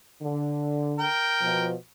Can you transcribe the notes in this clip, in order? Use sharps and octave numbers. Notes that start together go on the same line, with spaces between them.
D3
A#4 G5
B2 F3